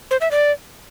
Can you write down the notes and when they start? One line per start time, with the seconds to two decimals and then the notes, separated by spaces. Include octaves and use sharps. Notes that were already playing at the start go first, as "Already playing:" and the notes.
0.11 C5
0.21 E5
0.31 D5